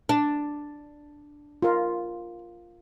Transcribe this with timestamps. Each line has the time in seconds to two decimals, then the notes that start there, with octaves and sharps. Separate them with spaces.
0.09 D4
1.62 F4 A#4